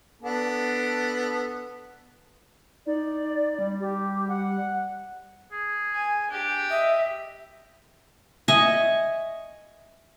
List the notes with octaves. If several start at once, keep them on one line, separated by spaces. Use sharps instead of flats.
B3 D4 A4
D#4 D5
G3
G4
F#5
G#4
G#5
D4 G4
D#5 E5
D#5 E5 G#5 C#6